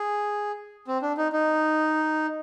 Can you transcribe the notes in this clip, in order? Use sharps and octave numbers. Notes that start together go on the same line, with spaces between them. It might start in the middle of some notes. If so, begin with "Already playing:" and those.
Already playing: G#4
C4
D4
D#4
D#4